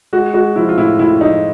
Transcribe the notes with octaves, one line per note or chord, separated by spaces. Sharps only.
G#3 F#4
G#3 F#4
F3 E4
F4
A2 E4
A2 E4
F3 D#4